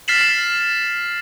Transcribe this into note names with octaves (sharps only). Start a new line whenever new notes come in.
F6 A6 B6 C7 E7 F#7